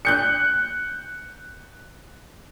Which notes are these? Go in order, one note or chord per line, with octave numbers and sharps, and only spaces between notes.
F#6 G6 C#7